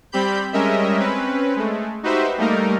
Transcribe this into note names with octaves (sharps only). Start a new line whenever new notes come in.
G3 C4 G4 B5 G6
G3 G#3 C#4 A#4 D#5 E5
C4 C#4 B4
G#3 A3
D#4 F#4 G4 B4 C5 E5
G3 A3 A#3 D#4 A#4